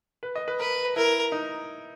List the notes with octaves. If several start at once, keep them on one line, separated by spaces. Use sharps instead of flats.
B4
D#5
B4
A#4 B4
E4 A#4
D#4